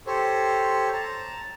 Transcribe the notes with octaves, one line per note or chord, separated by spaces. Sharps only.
G4 A4 C5 C#5
A5 A#5